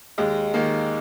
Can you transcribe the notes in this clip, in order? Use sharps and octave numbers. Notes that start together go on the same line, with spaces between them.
D#2 G#3
D#3 A#3